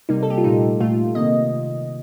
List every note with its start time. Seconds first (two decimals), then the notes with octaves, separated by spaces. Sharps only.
0.09 C3 G3 A#3 D#4
0.23 A4
0.30 G4
0.37 F4
0.44 A#2 A3 D#4
0.80 A#2 A3 F4
1.15 C3 D#3 A#3 D#5